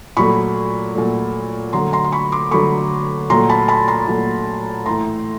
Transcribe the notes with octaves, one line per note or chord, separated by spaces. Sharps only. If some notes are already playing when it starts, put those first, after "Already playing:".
A#2 F#3 A3 B5 C#6
A#2 F#3 A3
D3 F#3 A3 A#5 C6
A#5 C6
C6
B5 C#6
C6 D6
D3 F#3 A3 B5 C#6
A#2 F#3 A3 A#5 C6
A5 B5
A5 B5
A#5 C6
A#2 F#3 A3
A2 E3 A3 A#5 C6